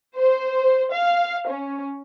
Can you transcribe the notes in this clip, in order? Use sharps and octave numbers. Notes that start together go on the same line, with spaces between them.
C5
F5
C#4